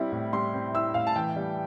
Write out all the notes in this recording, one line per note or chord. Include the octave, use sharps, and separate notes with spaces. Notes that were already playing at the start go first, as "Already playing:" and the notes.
Already playing: G3 C4 E4
A2
G3 C6
C4
E4 E6
A2 F5
A5
E3 G5
G3